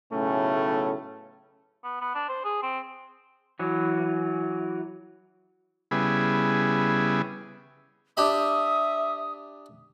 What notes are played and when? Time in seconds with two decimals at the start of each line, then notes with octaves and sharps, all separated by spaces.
0.12 B1 A2 C#3 A3 C#4
1.84 B3
2.01 B3
2.15 D4
2.28 C5
2.45 G#4
2.63 C4
3.59 E3 F#3
5.91 C#3 G3 B3 E4 G#4
8.17 D4 G4 E5 B5 D#6